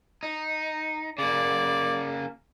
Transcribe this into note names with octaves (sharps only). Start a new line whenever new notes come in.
D#4
C#3 A#3 D5